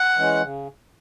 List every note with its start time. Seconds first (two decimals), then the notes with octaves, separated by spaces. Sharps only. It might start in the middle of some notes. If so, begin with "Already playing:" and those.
Already playing: F#5
0.16 E3 G#3 C#4
0.42 C#3